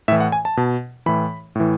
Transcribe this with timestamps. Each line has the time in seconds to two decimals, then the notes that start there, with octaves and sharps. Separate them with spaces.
0.08 A2 E5
0.12 E3
0.20 F#5
0.32 G#5
0.45 A5
0.57 B2
1.06 A2 E3 B5
1.55 A2 E3